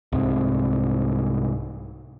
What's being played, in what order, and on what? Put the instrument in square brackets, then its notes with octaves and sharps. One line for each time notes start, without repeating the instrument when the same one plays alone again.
[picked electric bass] C2 G#2